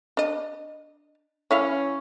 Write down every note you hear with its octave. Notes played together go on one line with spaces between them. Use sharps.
D4 D#5
E3 C#4 E4 F5